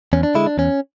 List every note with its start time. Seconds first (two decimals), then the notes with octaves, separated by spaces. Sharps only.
0.13 E2 C#4
0.23 D4
0.35 D3 G#3 E4
0.47 D4
0.58 E2 C#4